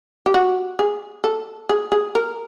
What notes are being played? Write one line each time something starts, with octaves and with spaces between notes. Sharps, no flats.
G4
F#4
G#4
A4
G#4
G#4
A#4